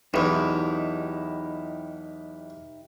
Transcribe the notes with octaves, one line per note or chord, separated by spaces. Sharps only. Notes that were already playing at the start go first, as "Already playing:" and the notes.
B1 E2 D#4 E4 G4